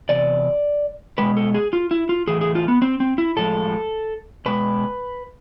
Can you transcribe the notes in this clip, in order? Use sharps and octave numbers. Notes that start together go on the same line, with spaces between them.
E2 C3 D5
B2 G#3 B4
A4
G#4
F4
E4
F4
A2 E3 A3 G#4
G#4
F4
B3
C4
C4
E4
A2 F3 G#3 A4
B2 G#3 B4